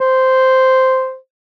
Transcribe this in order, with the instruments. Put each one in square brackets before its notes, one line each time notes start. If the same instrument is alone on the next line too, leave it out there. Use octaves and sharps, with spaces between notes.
[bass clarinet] C5